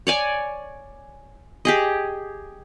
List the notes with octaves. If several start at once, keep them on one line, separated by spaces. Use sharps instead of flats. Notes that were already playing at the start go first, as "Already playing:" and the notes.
C#5 D5 G#5
G4 G#4 D#5